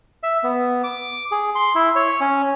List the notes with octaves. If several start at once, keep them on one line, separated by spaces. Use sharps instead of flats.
E5
B3
D6
G#4
C6
E4
C#5
C#4